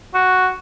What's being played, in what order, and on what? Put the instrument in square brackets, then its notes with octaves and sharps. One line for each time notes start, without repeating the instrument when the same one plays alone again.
[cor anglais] F#4